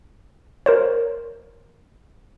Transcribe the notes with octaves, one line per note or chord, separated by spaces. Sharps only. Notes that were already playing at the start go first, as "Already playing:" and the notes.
A#4 C5 C#5